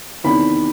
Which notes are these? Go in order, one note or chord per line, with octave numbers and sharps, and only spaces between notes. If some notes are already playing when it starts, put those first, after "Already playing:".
E2 C3 D#3 B5